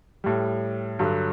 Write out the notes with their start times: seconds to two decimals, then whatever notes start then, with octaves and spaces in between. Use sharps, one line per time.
0.24 A2 G3
0.99 G2 D3 F#3